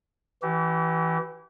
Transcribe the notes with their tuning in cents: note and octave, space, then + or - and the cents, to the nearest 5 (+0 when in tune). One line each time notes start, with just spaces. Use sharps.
E3 -5 G4 -45